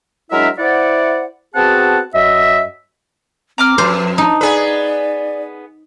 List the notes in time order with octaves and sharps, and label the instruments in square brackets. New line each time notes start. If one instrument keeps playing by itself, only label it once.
[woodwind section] F#3 G#3 D4 E4 A#4 E5
E4 C5 D5 F#5
B3 C4 F#4 G#4 F#5 A5
F#2 D#5 E5
[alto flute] C4 [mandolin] A#5 D6 F6
[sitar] F2 [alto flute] B4 [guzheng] C5
[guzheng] D#4 [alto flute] A5
[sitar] B3 G#4 B4 [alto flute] D5